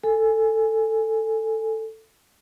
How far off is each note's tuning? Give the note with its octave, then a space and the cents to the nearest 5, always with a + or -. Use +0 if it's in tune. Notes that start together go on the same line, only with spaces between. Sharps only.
A4 +10 G#5 +0